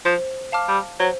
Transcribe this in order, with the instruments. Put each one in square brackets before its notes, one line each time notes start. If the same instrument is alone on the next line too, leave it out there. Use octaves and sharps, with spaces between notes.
[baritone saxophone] F3 [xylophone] C5
[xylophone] F5 A5 D6 F6
[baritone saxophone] G3
[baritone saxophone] F#3 [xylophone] C5